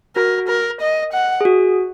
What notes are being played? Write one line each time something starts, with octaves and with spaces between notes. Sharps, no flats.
F#4 A#4
A#4
D#5
F#5
G#4
F#4